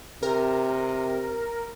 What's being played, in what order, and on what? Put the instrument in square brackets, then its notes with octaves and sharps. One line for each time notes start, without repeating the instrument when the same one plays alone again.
[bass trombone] C3 [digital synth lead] A#4